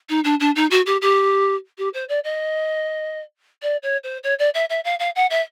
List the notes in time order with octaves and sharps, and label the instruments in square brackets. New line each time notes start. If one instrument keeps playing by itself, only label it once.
[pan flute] D#4
D4
D4
D#4
F#4
G4
G4
G4
C5
D5
D#5
D5
C#5
C5
C#5
D5
E5
E5
F5
F5
F#5
E5